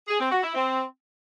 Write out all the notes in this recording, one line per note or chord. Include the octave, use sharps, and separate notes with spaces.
G#4
C4
F#4
E4
C4